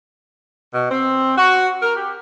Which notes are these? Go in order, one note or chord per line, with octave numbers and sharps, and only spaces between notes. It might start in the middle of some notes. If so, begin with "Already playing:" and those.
B2
C4
F#4
A#4
G4